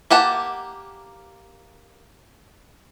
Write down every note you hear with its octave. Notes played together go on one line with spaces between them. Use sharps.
A#3 G4 F#5 A5